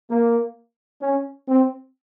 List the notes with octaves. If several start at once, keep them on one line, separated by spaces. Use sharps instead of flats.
A#3
C#4
C4